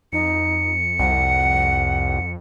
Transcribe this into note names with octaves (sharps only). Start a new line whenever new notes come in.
F2 D#4 C#7
C2 F#5